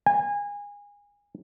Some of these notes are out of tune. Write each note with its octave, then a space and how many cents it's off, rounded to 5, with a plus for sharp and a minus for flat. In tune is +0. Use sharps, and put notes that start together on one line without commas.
G#5 -25